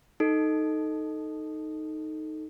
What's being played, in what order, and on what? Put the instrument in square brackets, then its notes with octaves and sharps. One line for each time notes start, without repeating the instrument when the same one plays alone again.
[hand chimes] D#4 A4